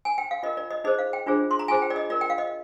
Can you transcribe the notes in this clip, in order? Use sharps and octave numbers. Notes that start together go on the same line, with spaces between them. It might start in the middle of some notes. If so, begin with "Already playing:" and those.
G#5
G5
F5
F4 A#4 D#5
D5
D#5
D#4 G#4 C5 D#5
F5
G5
D4 F4 G#4 C5
C6
A#5
F4 G#4 C5 G#5
G5
D5
D#5
F4 A#4 D5
G5
F5
D#5